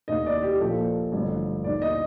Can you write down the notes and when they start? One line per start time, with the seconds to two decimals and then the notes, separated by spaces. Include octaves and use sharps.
0.08 F1 D#2 D#3 D#5
0.26 D5
0.43 G4
0.60 A#1 A#2 F3 A4
1.12 A1 G2 D3 F3
1.64 D#2 D#3 D5
1.82 D#5